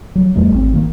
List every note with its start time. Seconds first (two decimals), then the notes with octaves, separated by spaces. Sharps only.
0.15 F#3
0.35 E2 G3 A3
0.52 G#1 C4
0.73 D#3 A#3